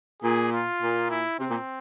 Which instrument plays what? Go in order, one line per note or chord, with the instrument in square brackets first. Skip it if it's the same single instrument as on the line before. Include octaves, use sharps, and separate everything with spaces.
[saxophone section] A#2 [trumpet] G#4
[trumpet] F4
[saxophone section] A#2
[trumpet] E4
[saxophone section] C3 [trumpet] C4
[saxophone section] A#2